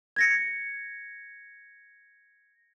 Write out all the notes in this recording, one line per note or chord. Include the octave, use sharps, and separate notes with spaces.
G#6 A#6 C#7